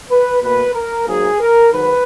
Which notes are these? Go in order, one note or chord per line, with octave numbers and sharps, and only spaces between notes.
B4
B2 A#3 B4
A#4
G#2 F#3 A#3 G#4
A#4
G#2 D#3 F#3 B4